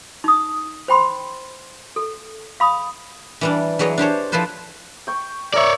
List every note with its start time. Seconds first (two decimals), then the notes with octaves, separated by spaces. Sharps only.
0.24 D#4 D#6
0.88 C5 G5 B5 C6
1.96 A4
2.60 F5 B5 D#6
3.41 E3 G3 D4
3.79 E3 F#3 G#4 C#5 D#5
3.98 D4 G4 C5 C#5
4.32 F3 E4 A4 B4 C5
5.07 G5 C#6
5.54 A#4 C#5 D5 E5 C#6